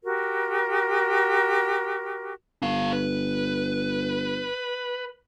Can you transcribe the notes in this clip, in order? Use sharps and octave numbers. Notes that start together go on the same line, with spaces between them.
F#4 G4 A#4
G1 D4 F5
B4